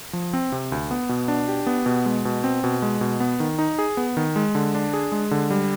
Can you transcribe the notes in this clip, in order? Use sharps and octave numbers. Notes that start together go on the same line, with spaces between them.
F3
C4
C3
D2
B3
B2
D4
G4
B3
B2
G#3
B2
C4
B2
G#3
B2
B3
D#3
D#4
G#4
B3
D#3
G#3
D3
D4
G#4
G#3
D3
G3